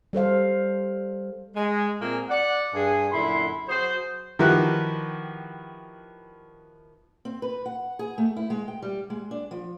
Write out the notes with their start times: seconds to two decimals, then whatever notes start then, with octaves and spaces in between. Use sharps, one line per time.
0.13 G3 A4 C5 F5
1.56 G#3
2.00 A#2 A3 A#3 C4 G#4
2.30 D5 F#5
2.74 G2 G#4
3.12 F#2 A#2 D3 E4 B5 C6
3.68 F#3 F#4 G#4 C5
4.39 D#3 F3 E4 F#4 G4 B4
7.25 C4
7.42 B4
7.66 F#5
7.99 G#4
8.18 A3
8.36 E4
8.50 G#3
8.68 G5
8.82 G3
9.10 G#3
9.31 D4
9.51 F3